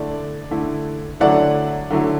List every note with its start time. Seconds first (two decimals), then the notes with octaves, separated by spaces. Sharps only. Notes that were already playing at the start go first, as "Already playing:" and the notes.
Already playing: D3 A3 E4 D5
0.51 D3 A3 E4
1.20 D3 F#3 A3 E4 D5 F#5
1.90 D3 F#3 A3 E4